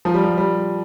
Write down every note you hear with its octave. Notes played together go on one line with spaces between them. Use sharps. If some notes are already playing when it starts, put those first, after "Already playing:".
F3
G3
F3
G3